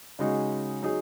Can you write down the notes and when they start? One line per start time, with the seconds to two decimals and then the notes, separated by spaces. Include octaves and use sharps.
0.19 C#3 G#3 D#4 F#4
0.82 F#3 D#4 G#4